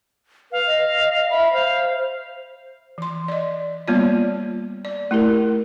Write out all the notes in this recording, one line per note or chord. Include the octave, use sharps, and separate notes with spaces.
B4 F5
D#5
E5 B5
C5 F5
E3 C6
D5 D#5
G3 A#3 B3 F4 C#5 D5
D5
A3 E4 G4 A#4